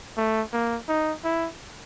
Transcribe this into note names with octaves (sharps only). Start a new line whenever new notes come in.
A3
A#3
D#4
E4